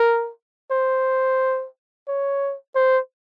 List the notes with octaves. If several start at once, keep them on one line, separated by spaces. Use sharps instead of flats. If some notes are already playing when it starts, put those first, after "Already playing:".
Already playing: A#4
C5
C#5
C5